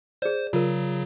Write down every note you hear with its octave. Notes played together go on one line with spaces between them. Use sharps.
G#4 C5 D5
C#3 F#3 F4 A#4